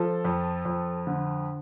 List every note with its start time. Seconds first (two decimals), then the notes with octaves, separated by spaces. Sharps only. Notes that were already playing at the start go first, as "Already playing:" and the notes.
Already playing: F3 A4
0.25 F2
0.65 F2
1.07 D3